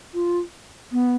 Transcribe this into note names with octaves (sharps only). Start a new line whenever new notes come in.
F4
B3